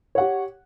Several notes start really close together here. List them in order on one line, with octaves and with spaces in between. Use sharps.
C#5 F#5 G4